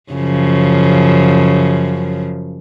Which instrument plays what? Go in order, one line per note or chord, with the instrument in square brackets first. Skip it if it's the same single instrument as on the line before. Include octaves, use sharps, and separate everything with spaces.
[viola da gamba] F#2 C#3 F3